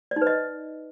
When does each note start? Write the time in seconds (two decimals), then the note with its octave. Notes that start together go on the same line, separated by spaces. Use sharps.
0.11 D5
0.16 D#4
0.21 B4
0.27 D#5